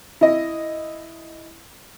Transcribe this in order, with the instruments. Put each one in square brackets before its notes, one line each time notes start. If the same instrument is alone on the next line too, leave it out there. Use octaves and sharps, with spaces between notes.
[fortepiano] E4 D#5